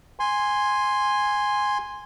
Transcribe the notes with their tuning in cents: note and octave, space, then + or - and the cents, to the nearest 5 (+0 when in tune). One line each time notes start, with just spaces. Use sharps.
G#5 -5 C6 +5